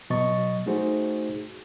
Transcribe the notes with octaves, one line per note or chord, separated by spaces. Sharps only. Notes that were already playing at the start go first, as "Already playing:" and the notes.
B2 F#3 D#5 C#6 A6
A3 D#4 F#4 G#4 C5